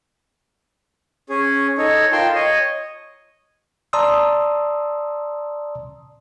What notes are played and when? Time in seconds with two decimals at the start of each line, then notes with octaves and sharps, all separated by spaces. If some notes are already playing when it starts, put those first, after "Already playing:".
1.29 C#4 G#4
1.78 D#4 A4 C#5
2.12 F4 A#4 G5 A5 C6
2.35 C#5 D#5
3.93 D5 A5 A#5 C6 D#6 E6